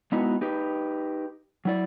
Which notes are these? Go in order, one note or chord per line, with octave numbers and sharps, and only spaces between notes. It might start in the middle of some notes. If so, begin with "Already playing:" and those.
G#3 B3 D#4 E4 F#4
D#4 G4 B4
F#3 E4 D5